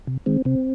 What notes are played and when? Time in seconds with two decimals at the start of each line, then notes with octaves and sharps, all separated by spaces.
0.07 C3
0.26 D#3 G#3 C4
0.45 C3 C4